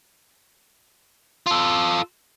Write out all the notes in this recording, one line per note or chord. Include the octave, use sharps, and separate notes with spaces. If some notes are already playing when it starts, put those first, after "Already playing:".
F4 A4